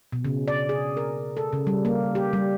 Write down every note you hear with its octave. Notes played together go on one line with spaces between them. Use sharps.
B2
C#3
D5
G#4
A#4
A4
C#3
G3
A#3
G4
G3